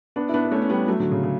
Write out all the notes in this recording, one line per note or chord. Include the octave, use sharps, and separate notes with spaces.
B3 D4
E4
B3 D4
B3
A3 C#4
C#4
G3 B3
F#3 A3
D3 F#3
C#3
C#3